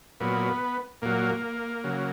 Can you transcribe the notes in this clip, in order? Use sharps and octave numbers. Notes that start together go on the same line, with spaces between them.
A#2 F#3 B3
A#2 F#3 A#3
C#3 F#3